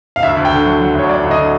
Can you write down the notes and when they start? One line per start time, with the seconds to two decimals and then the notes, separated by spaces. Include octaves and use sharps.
0.16 F5
0.23 D2 E5
0.37 D2
0.45 G5
0.51 D3
0.66 F#3
0.81 F#3
0.95 D2 C#5
1.08 F#3 D5
1.23 D2
1.31 D#5
1.37 D3